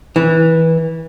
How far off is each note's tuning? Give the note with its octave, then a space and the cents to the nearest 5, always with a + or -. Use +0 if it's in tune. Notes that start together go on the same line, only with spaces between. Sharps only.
E3 -20